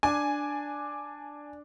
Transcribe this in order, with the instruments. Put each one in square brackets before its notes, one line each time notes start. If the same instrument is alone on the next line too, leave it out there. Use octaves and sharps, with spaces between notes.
[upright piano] D4 [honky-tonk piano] G#5